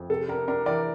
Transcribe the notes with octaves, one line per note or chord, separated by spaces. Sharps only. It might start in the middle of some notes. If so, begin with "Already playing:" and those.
Already playing: F2
C3 A4
D4 A#4
D4 A#4
E3 A#4 D5